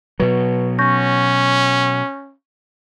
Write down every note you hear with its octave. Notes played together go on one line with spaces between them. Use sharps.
B2 F#3 B4
C#4 C#6 G6 A#6